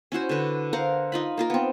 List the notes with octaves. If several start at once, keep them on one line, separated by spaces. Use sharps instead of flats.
C#4 E4 F#4 C5
D3 B4
A#4 C5 F5 F#5
D#4 F4 B5
A#3 F4 A#4
B3 C4